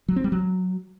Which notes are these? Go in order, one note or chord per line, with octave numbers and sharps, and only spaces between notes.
F#3
C4
G3
F#3